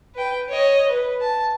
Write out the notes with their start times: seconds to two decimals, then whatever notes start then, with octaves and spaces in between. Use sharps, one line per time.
0.15 B4 G5
0.49 C#5 D#5
0.89 B4
1.21 A5